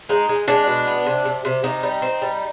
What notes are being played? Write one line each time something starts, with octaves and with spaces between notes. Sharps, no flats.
G#3 D#4
G#3
G#3 D4
B2
B3
C3
C3
C3
C3 D#4
G3
C4
G3